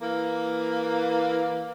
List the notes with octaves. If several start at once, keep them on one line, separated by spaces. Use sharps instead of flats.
E3 A#3